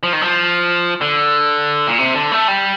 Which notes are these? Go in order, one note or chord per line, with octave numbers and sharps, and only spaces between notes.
F3
D#3
F3
D3
A#2
C3
D3
A3
G3